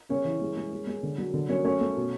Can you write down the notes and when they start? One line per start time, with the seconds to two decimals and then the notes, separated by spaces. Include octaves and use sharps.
0.09 C#3 C#4 C#5
0.25 E3
0.41 G#3
0.56 G#3
0.72 G#3
0.87 G#3
1.03 D3
1.18 F#3
1.34 D3
1.49 F#3 C#4 C#5
1.64 A3 C#4 C#5
1.81 A3
1.97 B2